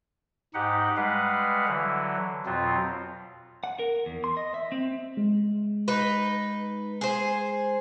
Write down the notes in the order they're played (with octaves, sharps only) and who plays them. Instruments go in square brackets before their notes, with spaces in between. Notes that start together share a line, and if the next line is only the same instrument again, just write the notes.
[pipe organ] G#2 D#4 G4 F#5
G3 G#3 B4 F5 F#5
D3 E3 F#3
F2 B2 F#3 C4 F4
[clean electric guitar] F#5
A#4
E2
C6
D#5
E5
C4
[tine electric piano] G#3
[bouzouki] D#4 B4
G#4 C5